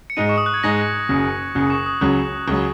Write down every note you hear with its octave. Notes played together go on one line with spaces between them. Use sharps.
C#7
G#2 G#3 D#4 D#7
C#6
D#6
F#6
G#6
G#2 G#3 D#4 A#6
F#1 F#2 C#3
F#1 F#2 C#3 F#6
D#6
C#6
D#6
C#2 C#3 F#3 F#6
C#2 C#3 F#3